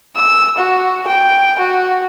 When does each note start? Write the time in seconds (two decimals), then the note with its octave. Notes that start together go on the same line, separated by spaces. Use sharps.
0.16 E6
0.57 F#4
1.07 G5
1.59 F#4